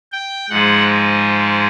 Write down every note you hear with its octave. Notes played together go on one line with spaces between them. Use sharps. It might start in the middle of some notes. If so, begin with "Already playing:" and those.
G5
G#2 F3 G#3 F#5